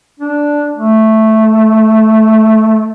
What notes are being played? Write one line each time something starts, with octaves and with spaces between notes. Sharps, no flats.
D4
A3